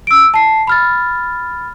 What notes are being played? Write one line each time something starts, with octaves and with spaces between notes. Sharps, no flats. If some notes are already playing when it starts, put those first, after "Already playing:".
E6 D7
A5 C7
B5 F6 A6